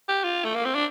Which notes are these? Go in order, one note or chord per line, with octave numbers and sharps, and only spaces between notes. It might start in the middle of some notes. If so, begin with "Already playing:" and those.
G4
F4
A3
A#3
C4
D4